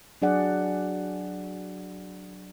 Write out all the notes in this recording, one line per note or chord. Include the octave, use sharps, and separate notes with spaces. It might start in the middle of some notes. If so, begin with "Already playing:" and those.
F#3 D4 G#4 D5 F#5